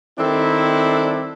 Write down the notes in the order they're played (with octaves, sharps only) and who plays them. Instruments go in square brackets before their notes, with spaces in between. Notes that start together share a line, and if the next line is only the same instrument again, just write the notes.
[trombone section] D#3 C4 E4 [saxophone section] G3 D4 A4